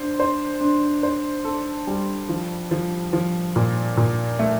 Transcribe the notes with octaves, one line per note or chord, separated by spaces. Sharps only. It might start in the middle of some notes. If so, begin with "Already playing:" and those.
Already playing: D4 C5
C5
D4
C5
A4
G3
F3
F3
F3
A#2
A#2
A3